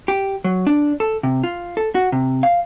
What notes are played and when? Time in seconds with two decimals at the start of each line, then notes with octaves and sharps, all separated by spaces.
0.08 G4
0.44 F#3
0.67 D4
1.00 A4
1.23 C3
1.44 F4
1.77 A4
1.95 F#4
2.12 C3
2.43 F5